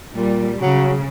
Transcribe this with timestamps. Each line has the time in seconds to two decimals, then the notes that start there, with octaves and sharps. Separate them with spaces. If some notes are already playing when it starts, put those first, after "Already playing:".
0.14 A#2 G3
0.61 C#3 F#3